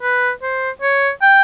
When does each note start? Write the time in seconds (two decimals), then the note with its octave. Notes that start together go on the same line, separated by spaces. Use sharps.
0.03 B4
0.42 C5
0.82 C#5
1.22 G5